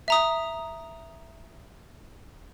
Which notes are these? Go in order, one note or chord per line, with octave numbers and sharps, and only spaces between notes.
E5 A#5 D#6